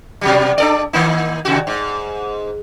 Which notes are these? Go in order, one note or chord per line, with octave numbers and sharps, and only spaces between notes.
B2 F#3 G3
D4 A4 D5
D#3 A#3 D#4
D#2 C3 F#4
G#2